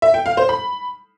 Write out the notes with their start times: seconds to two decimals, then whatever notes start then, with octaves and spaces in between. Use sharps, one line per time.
0.02 E5
0.14 G5
0.26 F5
0.37 C5
0.49 B5